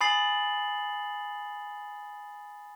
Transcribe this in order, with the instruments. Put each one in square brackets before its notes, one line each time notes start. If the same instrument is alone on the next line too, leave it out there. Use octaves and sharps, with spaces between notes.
[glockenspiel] G#5 B5 D#6 A6 C7 F#7